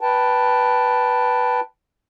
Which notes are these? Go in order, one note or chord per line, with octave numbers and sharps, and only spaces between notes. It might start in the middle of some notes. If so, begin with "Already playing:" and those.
B4 G5 A5